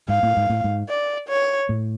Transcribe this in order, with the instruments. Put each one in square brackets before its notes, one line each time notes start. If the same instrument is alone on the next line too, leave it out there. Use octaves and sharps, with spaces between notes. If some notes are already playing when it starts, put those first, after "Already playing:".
[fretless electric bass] G#2 [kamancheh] F5
[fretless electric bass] A2
G#2
A2
G#2
[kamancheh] D5
C#5
[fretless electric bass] A2